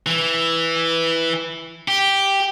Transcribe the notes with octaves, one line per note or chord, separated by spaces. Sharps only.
E3
G4